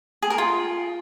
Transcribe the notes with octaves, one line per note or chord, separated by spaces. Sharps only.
G#4
A#4
F4